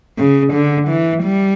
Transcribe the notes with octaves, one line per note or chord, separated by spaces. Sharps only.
C#3
D3
E3
G3